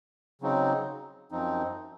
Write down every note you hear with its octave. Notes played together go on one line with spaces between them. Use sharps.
C#3 F#3 C4 D#4
F#2 F3 C4 D#4